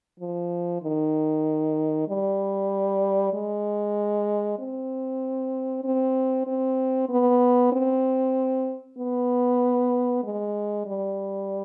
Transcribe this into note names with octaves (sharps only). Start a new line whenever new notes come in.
F3
D#3
G3
G#3
C4
C4
C4
B3
C4
B3
G#3
G3